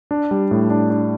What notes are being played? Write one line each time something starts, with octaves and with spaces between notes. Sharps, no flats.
D4
G3
A2
D4
D4